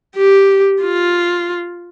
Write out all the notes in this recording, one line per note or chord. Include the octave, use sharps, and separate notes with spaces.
G4
F4